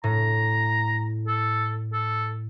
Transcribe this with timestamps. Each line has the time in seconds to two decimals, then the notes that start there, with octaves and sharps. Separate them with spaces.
0.04 A2 A#5
1.27 A4
1.93 A4